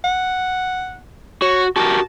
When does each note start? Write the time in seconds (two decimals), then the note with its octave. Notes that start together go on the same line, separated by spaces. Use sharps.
0.04 F#5
1.42 F#4 C#5
1.76 F#4 G4 A#4 A5